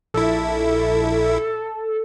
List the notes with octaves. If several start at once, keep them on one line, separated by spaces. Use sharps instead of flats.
A#1 E4 A4